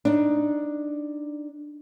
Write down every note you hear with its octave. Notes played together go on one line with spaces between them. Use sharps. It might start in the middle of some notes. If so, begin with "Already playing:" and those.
D4 D#4